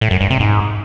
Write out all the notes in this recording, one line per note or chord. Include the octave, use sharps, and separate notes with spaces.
A2
F#2
G2
C3
G#2